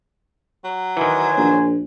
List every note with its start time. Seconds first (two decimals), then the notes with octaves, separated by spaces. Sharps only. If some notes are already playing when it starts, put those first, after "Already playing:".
0.64 F#3
0.97 D#3 E3 C5 G#5
1.37 A#1